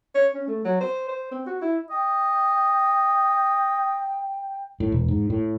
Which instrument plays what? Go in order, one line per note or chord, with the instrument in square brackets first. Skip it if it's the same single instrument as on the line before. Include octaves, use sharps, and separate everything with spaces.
[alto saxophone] C#5
C#4
A3
F#3
C5
C5
C4
F#4
E4
[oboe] D#5 [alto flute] G5
[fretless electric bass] A2
E1
G#2
A2